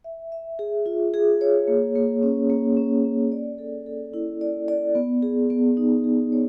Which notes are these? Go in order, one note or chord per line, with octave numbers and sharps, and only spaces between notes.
E5
E5
G#4
F4
G#4
C#5
A#3
A#3
C#4
A#3
C#4
C#4
D5
A4
A4
E4
D5
D5
B3
G#4
B3
D#4
G#4
C#5